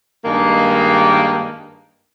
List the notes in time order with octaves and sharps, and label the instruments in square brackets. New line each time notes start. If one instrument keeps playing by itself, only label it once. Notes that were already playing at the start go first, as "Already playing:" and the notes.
[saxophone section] G2 D#3 G#3 A#3